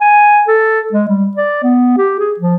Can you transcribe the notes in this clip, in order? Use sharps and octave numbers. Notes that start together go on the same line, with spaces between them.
G#5
A4
G#3
G3
D5
B3
G4
G#4
F3